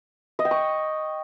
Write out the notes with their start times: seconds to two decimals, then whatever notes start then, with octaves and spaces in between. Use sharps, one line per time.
0.39 D#5
0.45 G5
0.51 C#6